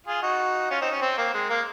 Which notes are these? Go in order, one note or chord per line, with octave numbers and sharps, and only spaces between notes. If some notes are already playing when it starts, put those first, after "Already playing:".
F4 G#4
D#4 F#4
C#4 F4
C4 D#4
C#4
C4
A#3
G#3
A#3